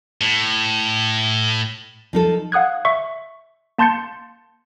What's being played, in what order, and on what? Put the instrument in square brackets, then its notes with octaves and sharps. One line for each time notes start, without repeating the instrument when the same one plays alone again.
[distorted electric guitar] A2
[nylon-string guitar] F3 D#4 A4
[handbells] F5 F#5 D#6 F#6 G#6
E5 C#6
A#3 A5 C6 G6 A6 C#7